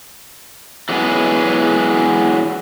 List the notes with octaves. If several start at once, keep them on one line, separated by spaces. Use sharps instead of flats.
E3 F#3 G#3 B3 G#4